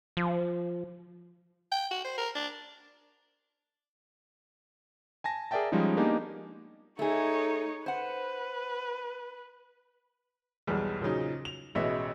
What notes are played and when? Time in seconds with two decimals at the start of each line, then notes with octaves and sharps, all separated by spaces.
0.17 F3
1.72 G5
1.91 F#4
2.05 C5
2.18 A#4
2.35 D4
5.24 G#5 A5 A#6
5.51 G#4 A#4 D5 E5 G5 A5
5.72 F3 G3 G#3 C#4 D#4
5.97 A#3 B3 D4 D#4 G4 G#4
6.99 A3 D#4 G#4 C#5
7.86 B4 C5 F#5
10.67 B1 E2 G3 G#3
11.01 A#2 C#3 F3 F#3 D#4
11.45 F7
11.75 A1 B2 G#3 B3 D#5 E5